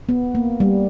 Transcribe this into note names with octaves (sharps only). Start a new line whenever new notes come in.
B3
A#3
G3